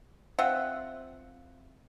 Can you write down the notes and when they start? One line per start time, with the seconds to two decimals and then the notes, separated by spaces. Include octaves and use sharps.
0.39 C4 F4 E5 F#5